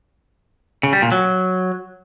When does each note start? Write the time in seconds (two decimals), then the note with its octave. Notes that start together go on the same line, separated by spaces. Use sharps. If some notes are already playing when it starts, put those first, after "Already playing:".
0.83 C#3
0.93 G3
1.02 A#2
1.12 F#3